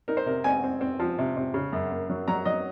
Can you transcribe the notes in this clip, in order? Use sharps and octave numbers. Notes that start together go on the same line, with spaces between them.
D#4 A#4
C5
C3 A#4
C4 G#5
C4
C4
F3
C3
C3
C#3
F#2
A#3
F#3
F#3 A#5
F#3 D#5